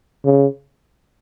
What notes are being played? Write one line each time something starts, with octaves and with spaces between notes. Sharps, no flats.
C#3